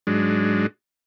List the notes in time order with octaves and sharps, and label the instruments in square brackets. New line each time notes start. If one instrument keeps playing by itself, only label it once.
[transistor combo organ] G#2 F#3 G#3 D4